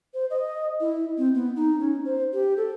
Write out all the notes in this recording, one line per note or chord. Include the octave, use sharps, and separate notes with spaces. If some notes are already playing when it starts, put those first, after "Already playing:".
C5
D#5
E4
C4
B3
D#4
C#4
C5
G4
A4